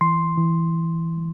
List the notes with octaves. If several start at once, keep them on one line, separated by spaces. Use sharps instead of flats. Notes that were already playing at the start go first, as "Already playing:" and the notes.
E3 C6
E3